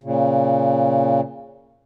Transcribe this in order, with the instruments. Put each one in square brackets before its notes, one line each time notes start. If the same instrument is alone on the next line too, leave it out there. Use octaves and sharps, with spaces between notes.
[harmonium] A#2 C#3